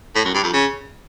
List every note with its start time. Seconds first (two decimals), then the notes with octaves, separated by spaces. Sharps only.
0.15 A2
0.25 F#2
0.34 G2
0.44 F2
0.53 C#3